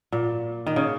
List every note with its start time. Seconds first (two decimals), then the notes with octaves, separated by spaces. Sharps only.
0.12 A#2
0.67 D#3
0.76 C#3